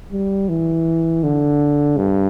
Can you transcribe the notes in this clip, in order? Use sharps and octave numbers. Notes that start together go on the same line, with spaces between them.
G3
E3
D3
G2